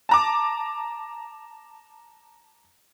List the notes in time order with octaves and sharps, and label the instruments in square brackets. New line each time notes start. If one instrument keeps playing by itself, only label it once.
[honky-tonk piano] A5 A#5 D6